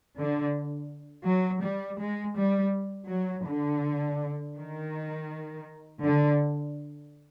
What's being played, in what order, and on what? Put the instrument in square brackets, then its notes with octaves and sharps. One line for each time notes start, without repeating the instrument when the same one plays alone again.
[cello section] D3
F#3
G3
G#3
G3
F#3
D3
D#3
D3